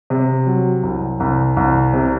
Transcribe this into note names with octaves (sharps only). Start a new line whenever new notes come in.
C3
F#3
C2
C2
C2
C3